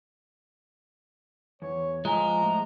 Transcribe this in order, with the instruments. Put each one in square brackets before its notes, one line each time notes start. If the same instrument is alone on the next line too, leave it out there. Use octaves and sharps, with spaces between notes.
[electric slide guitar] E2 [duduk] C#5
[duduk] F3 [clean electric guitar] G#3 [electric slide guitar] F4 G#5 [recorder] A#5
[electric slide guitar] A2